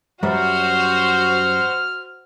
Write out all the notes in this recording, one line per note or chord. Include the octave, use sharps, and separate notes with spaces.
F#2 G3 F#4 C5 F6